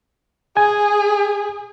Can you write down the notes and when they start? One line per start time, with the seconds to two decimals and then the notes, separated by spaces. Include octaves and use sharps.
0.57 G#4 G#5